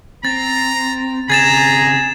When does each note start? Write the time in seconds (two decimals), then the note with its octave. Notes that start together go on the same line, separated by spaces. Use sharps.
0.25 C4 A#5 A6
1.30 C#3 C4 G#4 A#5 G#6 A6 E7